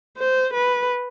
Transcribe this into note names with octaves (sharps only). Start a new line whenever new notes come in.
C5
B4